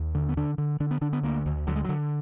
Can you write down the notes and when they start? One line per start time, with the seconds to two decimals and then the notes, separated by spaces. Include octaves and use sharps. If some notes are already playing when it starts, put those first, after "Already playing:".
Already playing: D#2
0.15 D3
0.29 B3
0.37 D3 D4
0.58 D3
0.80 D3 D4
0.91 B3
1.01 D3 D4
1.13 B3
1.23 D2 A#3
1.46 D2
1.67 D3 F#3
1.75 G#3
1.84 F#3
1.89 D3